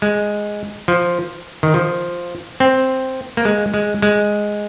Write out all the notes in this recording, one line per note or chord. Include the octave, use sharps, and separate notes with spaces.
G#3
F3
D#3
F3
C4
A#3
G#3
G#3
G#3